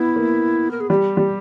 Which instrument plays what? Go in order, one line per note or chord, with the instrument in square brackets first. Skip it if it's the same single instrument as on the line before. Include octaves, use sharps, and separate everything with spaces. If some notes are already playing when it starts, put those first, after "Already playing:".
Already playing: [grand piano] B3 [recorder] E4
[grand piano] A#3
[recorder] A#4
G#4
[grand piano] G3 [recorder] G4
[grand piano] G3